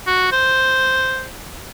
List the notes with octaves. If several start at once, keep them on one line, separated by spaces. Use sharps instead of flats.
F#4
C5